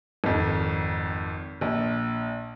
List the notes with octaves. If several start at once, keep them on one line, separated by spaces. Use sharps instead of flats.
G#1 F2
A#1